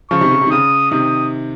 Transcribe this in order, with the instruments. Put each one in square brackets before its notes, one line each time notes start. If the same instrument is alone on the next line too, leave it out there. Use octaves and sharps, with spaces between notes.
[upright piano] C#3 F3 [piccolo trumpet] C#6
[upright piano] C3 D#3
C#3
C3
D#3
[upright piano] C#3 [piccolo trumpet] D#6
[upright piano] C3 D#3 [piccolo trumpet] D#6